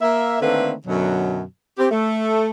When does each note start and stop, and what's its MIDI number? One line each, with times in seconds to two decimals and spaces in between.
0.02 0.39 58
0.02 0.39 76
0.41 0.73 50
0.41 0.73 51
0.41 0.73 57
0.41 0.73 58
0.41 0.73 60
0.41 0.73 71
0.86 1.43 42
0.86 1.43 47
0.86 1.43 50
0.86 1.43 54
1.78 1.89 60
1.78 1.89 67
1.91 2.50 57